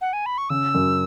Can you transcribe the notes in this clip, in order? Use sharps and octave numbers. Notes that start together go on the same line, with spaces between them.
F#5
G#5
B5
C#6
C#3 E6
F#2